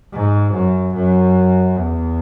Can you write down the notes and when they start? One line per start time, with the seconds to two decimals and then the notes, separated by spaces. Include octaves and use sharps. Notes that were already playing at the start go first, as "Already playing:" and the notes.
0.13 G#2
0.53 F#2
0.94 F#2
1.78 E2